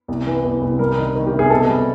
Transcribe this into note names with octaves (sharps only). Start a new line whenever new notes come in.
C2
E3
C2
C2
G3 A#4
D#3
D#3
G4
C3
G#4
B2 A4
G3